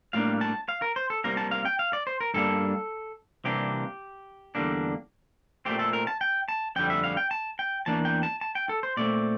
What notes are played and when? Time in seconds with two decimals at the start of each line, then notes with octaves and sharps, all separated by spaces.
0.13 A2 G3 A#3 D4 F5
0.41 A5
0.69 F5
0.82 A#4
0.96 C5
1.10 A4
1.24 C2 C3 G3 A#3 A#4
1.37 A5
1.51 F5
1.65 G5
1.79 F5
1.93 D5
2.07 C5
2.21 A#4
2.34 G2 D3 G3 A#3 D4 A4
3.44 C2 C3 E3 A#3 D4 G4
4.55 E2 D3 G3 A#3 D4
5.65 A#2 A3 C4 G4
5.79 A4
5.93 A#4
6.07 A5
6.21 G5
6.48 A5
6.76 F2 D3 G3 G5
6.90 E5
7.04 F5
7.17 G5
7.31 A5
7.59 G5
7.86 E2 E3 A#3 D4 A5
8.05 G5
8.23 A5
8.41 A5
8.55 G5
8.69 A4
8.83 C5
8.97 A#2 A3 C4 D5